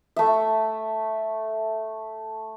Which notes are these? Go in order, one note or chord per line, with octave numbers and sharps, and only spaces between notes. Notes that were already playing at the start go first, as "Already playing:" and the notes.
A3 E5